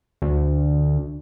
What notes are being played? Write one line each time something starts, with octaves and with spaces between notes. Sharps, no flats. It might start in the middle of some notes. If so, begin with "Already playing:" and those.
D2